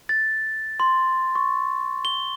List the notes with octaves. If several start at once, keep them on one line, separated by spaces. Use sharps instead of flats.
A6
C6
C#6
G7